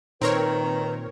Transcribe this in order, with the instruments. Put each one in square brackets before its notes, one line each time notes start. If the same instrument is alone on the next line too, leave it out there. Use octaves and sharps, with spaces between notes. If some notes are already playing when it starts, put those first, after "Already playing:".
[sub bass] A#2 [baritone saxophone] D#3 [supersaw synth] C4 A#4 C#5 [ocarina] B4